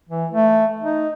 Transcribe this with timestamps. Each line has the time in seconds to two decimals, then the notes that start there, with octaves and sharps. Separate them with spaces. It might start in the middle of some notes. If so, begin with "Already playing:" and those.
0.09 E3
0.31 A3
0.81 D#4